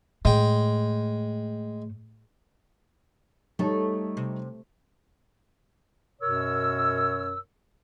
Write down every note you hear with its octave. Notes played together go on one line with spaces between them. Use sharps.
A2 G#3 G5
G3 A3 D#4 A4 C#5
C3
F#2 B2 A#4 C#5 E6